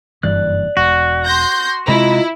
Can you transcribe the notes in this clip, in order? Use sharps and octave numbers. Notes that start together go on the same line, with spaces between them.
F#1 G2 E3 D5 F#6
E1 F#4
C6 G6 A#6
C3 G#3 E4 F4 D#5 A#5